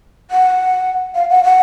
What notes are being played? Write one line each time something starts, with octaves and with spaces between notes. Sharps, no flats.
F#5
F5
F#5
F#5